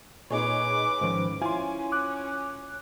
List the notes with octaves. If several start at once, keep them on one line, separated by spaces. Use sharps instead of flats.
A#2 D#4 G#4 B4 C#5 D6
G#2 D#3 F3 C#4 C5
C#4 E4 F4 G#5 C6
D6 F#6